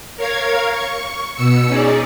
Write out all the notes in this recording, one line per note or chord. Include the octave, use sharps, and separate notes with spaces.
A#4 C#5 F5 G#6
C#6
B2 E6 C#7
C#4 D#4 G#4 D5